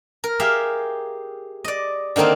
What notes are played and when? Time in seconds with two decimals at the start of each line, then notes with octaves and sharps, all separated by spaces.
0.24 A#4
0.40 G4 G#4 E5 F5
1.64 D5 D#5
2.16 D3 D#3 A#3 C4 D#4